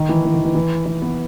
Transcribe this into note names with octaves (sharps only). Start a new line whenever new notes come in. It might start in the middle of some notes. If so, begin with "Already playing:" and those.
Already playing: D#3
E3
E3
D#3
E3
E3
E3
B3